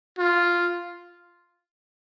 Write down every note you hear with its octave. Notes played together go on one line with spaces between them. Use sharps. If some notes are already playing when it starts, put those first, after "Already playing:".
F4